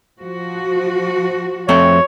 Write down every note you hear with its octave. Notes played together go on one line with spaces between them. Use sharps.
F3 F#4
F2 A3 C4 C#5